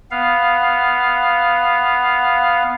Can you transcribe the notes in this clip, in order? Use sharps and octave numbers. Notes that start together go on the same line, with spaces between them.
B3 F5